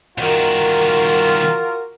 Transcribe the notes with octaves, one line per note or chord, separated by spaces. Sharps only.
C2 D#3 F4 F#4 A#4